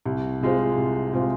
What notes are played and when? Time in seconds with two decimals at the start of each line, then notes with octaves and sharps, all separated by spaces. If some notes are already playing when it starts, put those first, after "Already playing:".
0.06 C2
0.41 C3 G#3 F4 C5
0.77 C2
1.13 C3 G#3 F4 C5